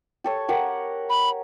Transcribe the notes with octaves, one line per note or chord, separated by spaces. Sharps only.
G4 A4 C#5
G4 A#4 F#5
B5